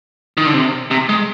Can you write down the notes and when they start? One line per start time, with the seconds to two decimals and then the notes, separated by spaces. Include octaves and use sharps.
0.37 D#3
0.46 D3
0.54 C3
0.91 C3
1.09 G#3